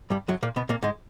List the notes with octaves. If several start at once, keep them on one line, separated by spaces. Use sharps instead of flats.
G2 G3
F#2 F#3
A#2 A#3
B2 B3
A#2 A#3
G#2 G#3